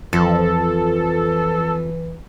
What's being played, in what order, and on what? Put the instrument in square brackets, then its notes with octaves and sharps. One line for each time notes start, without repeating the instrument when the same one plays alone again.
[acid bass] F2 [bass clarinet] E3 [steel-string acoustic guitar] F3 [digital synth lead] A4